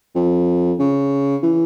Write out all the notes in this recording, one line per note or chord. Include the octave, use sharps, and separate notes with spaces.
F2
C#3
E3